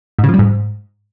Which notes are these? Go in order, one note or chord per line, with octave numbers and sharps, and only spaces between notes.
G#2
C#3
F3
G3
G#2